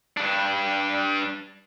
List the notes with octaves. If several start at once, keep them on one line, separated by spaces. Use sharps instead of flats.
G2 D4